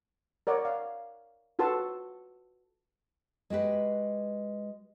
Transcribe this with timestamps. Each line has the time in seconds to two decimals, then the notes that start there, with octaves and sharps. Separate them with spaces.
0.47 A#4 C#5 D5 F#5
0.65 F5
1.59 F4 F#4 A4 B4 A5 C6
3.50 G#3 F#4 G4 B4